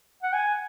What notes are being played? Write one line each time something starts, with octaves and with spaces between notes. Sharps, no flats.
F#5
G#5